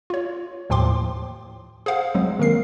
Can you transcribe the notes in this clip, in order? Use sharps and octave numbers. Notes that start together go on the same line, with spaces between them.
F4 C#5
D#2 A2 F3 G5 C6 D6
G#4 C5 F5 F#5
F#3 G#3 C4
D#3 A#3 A#4 C7